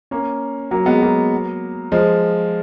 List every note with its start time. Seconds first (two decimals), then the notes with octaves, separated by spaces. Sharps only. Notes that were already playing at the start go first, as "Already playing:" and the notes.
0.11 A#3 C#4
0.71 F#3 A#3
0.86 G#3 B3
1.02 F#3 A#3
1.92 F3 G#3